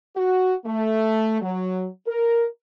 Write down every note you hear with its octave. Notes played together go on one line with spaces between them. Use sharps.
F#4
A3
F#3
A#4